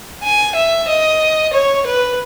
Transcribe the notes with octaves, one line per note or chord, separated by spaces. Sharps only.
G#5
E5
D#5
C#5
B4